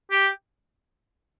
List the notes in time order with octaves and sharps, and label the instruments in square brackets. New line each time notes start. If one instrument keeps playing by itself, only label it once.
[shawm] G4